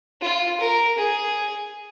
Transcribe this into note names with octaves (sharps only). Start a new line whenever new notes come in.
F4
A#4
G#4